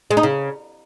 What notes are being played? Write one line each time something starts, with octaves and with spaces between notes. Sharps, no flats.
G#3
D#4
C#3